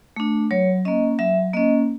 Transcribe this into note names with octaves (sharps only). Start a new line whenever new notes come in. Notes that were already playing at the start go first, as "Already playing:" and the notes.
A3 D4
F#3 C#5
A#3 C#4 D#5
F#3 E5
A#3 C#4 D#5